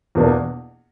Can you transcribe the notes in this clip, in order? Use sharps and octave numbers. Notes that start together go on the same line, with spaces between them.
E2 B2 A#3 D4